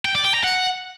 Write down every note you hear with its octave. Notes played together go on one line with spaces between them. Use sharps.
G5
D5
G5
A#5
F#5